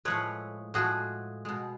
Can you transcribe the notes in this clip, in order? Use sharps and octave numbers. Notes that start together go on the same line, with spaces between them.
A2 F3 G#3 B4 C#5
A2 F3 G#3 F#4 G#4
B2 G#3